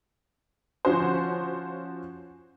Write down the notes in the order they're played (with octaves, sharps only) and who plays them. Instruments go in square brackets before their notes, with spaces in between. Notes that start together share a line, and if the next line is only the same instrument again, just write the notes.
[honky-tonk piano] F3 C#4 F#4 C5